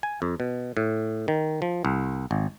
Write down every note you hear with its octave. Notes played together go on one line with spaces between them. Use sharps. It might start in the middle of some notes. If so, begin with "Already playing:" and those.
G#5
F2
B2
A2
D#3
F3
C2
G#1